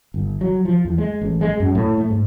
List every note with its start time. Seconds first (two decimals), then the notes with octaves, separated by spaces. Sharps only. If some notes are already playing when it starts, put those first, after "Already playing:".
0.14 G1
0.41 F#3
0.65 F3
0.85 E2
0.98 G#3
1.22 A1
1.41 G#3
1.60 F#2
1.75 A2
1.98 A3
2.10 G#2